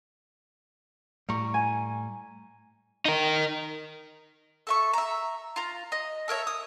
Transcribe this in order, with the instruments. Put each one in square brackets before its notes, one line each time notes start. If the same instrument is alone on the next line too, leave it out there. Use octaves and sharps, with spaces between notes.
[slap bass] A2 G3 [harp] A#5 C#6
[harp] G#5
[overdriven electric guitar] D#4 A#4
[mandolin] A4 E5 C#6
E5 A#5
F4 A#5
D#5
A4 A#4 C#5 E5
D#6